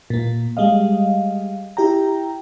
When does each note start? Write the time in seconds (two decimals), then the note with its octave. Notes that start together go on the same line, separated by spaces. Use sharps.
0.10 A#2 A#3
0.57 G3 G#3 D#5 F5
1.77 E4 G4 G5 A#5